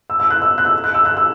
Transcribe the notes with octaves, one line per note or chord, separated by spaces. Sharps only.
E6
E6
F#6
E6
F#6
E6
F#6
E6
F#6
E6